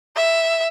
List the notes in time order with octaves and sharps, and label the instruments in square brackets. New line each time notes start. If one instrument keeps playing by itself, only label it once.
[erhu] E5